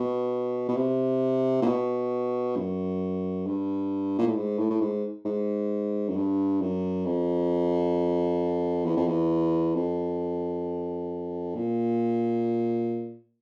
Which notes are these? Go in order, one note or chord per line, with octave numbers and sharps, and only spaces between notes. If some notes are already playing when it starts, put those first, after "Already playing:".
Already playing: B2
B2
C3
A#2
B2
F#2
G2
A#2
A2
G#2
A2
A2
G#2
G#2
F#2
G2
F#2
F2
E2
F2
E2
F2
A#2